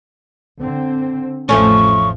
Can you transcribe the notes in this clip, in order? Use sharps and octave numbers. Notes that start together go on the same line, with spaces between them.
D3 C4
A1 F2 F3 A3 C#4 C#6